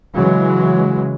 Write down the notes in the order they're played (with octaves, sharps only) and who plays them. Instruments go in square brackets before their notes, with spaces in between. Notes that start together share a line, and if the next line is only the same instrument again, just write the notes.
[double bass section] C#3 E3 F#3 G#3